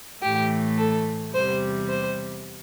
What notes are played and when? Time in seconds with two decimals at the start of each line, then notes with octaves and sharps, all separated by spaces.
0.23 A2 E3 A3 G4
0.78 A4
1.34 E2 C3 G3 C5
1.89 C5